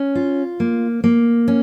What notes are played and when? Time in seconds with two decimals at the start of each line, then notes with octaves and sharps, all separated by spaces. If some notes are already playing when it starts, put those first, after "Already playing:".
Already playing: C#4
0.15 F4
0.60 A#3
1.04 A#3
1.48 C#4